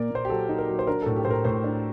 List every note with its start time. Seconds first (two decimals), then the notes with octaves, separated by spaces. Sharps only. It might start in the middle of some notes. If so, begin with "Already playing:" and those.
Already playing: A#2 A#3 A#4 D5
0.10 A#2 C5
0.25 G4
0.29 F#3 A4
0.49 D#4
0.58 A#4
0.68 F#3
0.79 C5
0.87 D4 A#4
1.02 A2 A4
1.16 G4
1.25 A2 C5
1.31 A#4
1.45 A2 C5
1.64 D4